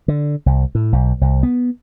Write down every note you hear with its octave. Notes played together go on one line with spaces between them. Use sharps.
D3
C2
A2
B1
C2
B3